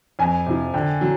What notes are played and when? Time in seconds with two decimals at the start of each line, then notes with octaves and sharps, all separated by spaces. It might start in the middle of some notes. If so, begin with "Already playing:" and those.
0.19 F2 G#5
0.46 C3 F3
0.74 D3 G5
1.01 F#3